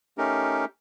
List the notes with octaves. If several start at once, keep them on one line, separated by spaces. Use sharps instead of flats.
A3 C#4 D#4 G4 A#4